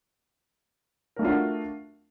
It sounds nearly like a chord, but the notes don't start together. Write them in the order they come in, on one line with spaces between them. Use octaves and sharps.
A#4 A3 D4 F4 F#4